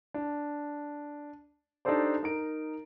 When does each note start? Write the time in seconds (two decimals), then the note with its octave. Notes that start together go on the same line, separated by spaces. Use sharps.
0.14 D4
1.85 D4 D#4 G4 A4 C5 D5
2.23 D#4 A#4 D7